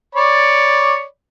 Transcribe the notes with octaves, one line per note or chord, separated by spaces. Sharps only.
C#5 D5 B5